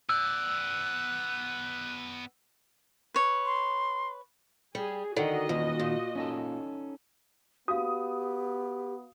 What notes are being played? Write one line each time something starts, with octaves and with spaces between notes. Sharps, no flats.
B3 D5 E6 F#6
B4 C#5
C6
G3 G#4
D3 D#3 F#4 D5 D#5 F#5 A#5
E2 D#3 A#3 F4
A#2
C#4 D#4 A4
B3 F#4 G4 F5 D#6